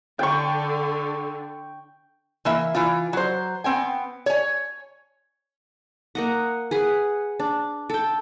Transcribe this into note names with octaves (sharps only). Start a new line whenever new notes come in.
D3 G5 C#6
E3 A#3 E5
E3 F4
F#3 C5
B3 C4 G5 G#5
C#5 G#5
A#3 D#5 F#5
G#4 B4 F#5
D4
A4 G5